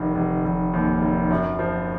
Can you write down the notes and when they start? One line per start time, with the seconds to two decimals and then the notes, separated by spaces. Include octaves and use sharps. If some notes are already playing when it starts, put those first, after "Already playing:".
Already playing: F1 D#3
0.15 F1
0.44 F1
0.73 D#2
1.02 F1
1.30 F#2
1.59 F3